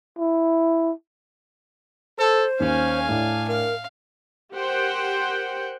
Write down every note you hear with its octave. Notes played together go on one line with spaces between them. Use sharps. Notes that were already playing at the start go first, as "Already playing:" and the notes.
E4
A4 C5
D#2 C#4 F5 G#5
A2 D4
A#4 F5
G4 A#4 C5 F#5 G5